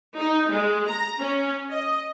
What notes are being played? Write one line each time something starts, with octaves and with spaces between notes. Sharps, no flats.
D#4
G#3
A#5
C#4
D#5